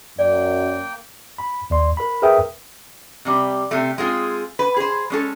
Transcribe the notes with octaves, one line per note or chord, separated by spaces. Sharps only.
F#2 A#3 D5 G5
B5
D#2 D5 C6
A#4 B5
G#4 A#4 B4 E5 G5 D#6
C3 G3
C3 A3
G#3 C4 F4 G#4
B4
G#4 C5
G#3 C#4 A4